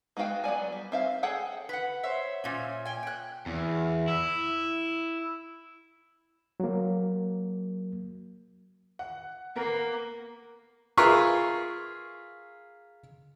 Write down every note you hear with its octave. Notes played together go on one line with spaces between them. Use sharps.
G#3 B3 F#4 F5 G5
F#3 B3 D5 G#5
G3
C4 E5 F5
G#4 A4 C#5 F#5 G5
B4 F#5
C5 C#5 E5
A#2 C#4
G5 G#5
G5 F#6
E2
E4
F#3 A#3
F#5
A#3 B3 A#4
F4 G#4 A#4 B4 E5 C#6